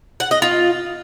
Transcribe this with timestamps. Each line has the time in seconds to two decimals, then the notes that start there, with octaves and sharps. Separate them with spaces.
0.20 F#5
0.31 D#5
0.42 F4